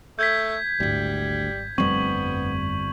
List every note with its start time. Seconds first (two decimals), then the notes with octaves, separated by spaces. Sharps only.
0.19 A3 G6 G#6 B6
0.80 G#1 D2 G3 E4
1.78 G1 F2 G3 A3 B3 C4 C#6 F#7